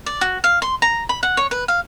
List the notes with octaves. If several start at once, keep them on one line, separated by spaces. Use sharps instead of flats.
D5
F#4
F5
C6
A#5
B5
F#5
C#5
B4
F5